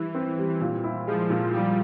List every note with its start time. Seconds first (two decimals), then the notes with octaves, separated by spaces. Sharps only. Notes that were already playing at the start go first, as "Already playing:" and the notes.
Already playing: E3 G3 E4
0.15 C4
0.38 G3
0.61 A#2
0.84 E4
1.07 F3 G#3
1.30 A#2
1.53 F3 G3